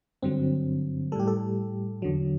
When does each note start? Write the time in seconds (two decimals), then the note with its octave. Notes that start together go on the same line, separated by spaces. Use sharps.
0.23 G2 D3 F#3 C4
1.12 G3 A4
1.15 A2 G4
1.27 A4
2.02 E2 D3 F#3